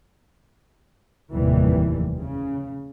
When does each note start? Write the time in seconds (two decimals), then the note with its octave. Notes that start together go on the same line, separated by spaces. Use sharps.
1.33 F1 D#2 A2 C3 E3 G3
2.20 C#3